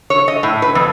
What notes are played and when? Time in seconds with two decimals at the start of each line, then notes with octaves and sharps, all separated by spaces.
0.10 C#5
0.28 D#5
0.43 A2
0.62 B4
0.75 F2